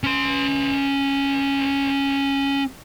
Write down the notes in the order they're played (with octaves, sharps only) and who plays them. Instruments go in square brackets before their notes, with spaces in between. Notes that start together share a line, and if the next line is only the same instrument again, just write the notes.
[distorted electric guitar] C#4 C6